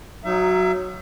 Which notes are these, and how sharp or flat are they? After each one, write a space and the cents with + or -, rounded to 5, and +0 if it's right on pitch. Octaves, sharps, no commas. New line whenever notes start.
F#3 +0 D#4 +0 E5 +35